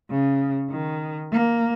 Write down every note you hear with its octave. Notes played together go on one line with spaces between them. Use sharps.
C#3
D#3
A#3